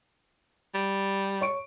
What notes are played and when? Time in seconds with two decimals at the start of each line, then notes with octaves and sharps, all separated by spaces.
0.74 G3
1.41 C#5 C#6 D7